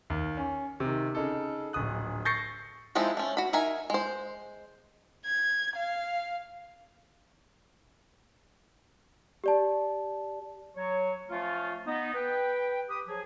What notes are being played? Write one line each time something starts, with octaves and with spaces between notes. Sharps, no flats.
D#2
C#4
C3 D#3
C#3 D#4 A4
D1 A#1 D#6 F#6
C#6 G6 A6 A#6 C7 C#7
F3 G#3 C4 D#4 E4
A3 C#4
F#4 B5
D#4 A#4 E5 G#5
G#3 C5
G#6
F5
G4 D5 A5
F#3 C#5
F3 A3 C#4 F4
B3 D#4
B4 G5
G4 B4 D#6
F3 F#3 G#4